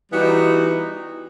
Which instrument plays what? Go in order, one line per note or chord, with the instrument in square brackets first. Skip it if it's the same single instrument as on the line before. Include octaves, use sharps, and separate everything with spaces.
[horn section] E3 G3 B3 D#4 F#4